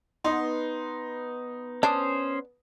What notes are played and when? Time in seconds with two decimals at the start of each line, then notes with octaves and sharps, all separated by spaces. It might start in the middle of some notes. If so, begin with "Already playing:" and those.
0.24 B3 D#4 C6
1.83 C#4 D4 C5 D#6